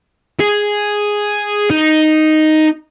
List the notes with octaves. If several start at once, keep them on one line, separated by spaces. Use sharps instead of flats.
G#4
D#4